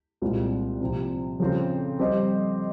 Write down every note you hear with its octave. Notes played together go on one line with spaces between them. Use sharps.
C2 A#2 G#3 C4 F4
C3 F3 C4
F2 C#3 F3 C4 F4
G3 C4 G4 C5 D#5